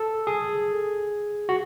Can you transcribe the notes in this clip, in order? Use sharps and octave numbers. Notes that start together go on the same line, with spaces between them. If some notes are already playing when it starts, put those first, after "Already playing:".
Already playing: A4
G#4
F#4